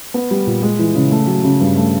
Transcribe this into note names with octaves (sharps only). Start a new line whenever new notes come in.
B3
G3
A#2
G#3
E3
C#3
A3
F#3
C#3
G2
A3